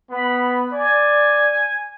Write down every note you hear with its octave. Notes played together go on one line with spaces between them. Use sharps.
B3 B5
D5 G#5